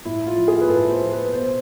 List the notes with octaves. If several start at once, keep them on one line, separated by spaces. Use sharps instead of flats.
A2 E4
F4
F3
G#4
B4
A2 A4
C5
F3
B4
B2 C5